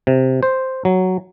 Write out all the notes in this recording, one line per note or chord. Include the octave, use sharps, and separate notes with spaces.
C3
C5
F#3